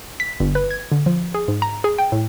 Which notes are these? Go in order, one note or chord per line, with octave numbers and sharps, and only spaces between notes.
B6
G1
B4
G#6
D3
F3
G#4
G#2
A#5
G#4
G5
A2